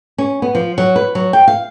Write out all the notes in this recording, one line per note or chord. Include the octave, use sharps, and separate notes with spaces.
C#4
B3
F3
F#3
B4
F#3
G5
F5